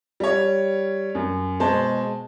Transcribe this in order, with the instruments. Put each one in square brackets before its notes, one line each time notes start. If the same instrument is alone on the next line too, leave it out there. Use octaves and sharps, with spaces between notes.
[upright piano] G3 C#5
F#2
B2 G#3 C5 A5